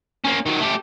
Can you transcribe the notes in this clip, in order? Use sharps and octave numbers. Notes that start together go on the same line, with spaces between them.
A#3 C#4
D#3 F#3
A3 G4